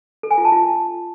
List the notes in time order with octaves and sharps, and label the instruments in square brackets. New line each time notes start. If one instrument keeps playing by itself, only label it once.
[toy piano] A4
G#5
F4
A5
F4